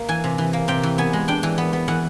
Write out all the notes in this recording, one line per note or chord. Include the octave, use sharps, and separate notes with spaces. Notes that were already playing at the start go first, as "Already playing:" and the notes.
Already playing: A#3
E3 G#5
C3
E3
A#3
C3 G5
E3
B3 G#5
G#3
D4 G5
E3
B3
B3
E3 F#5